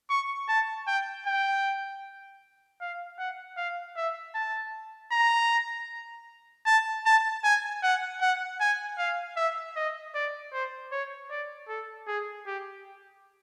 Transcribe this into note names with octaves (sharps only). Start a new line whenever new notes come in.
C#6
A5
G5
G5
F5
F#5
F5
E5
A5
A#5
A5
A5
G#5
F#5
F#5
G#5
F5
E5
D#5
D5
C5
C#5
D5
A4
G#4
G4